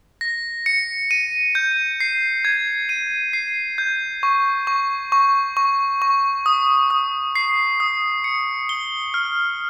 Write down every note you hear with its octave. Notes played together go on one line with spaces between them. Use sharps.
A#6
C#7
D#7
G6
C7
G#6
D#7
C7
G6
C#6
C#6
C#6
C#6
C#6
D#6
D#6
C7
D#6
C#7
G7
F6